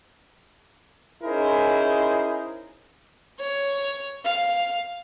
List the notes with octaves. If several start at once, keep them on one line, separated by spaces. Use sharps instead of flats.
C#4 D#4 E4 G#4 A#4 C5
C#5
F5